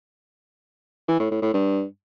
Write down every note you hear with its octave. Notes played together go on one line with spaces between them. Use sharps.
E3
A2
A2
A2
G2